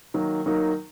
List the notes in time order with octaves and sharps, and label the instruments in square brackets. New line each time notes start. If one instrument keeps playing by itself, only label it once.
[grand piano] D#3 F#3 A#3 D#4
D#3 F#3 A#3 D#4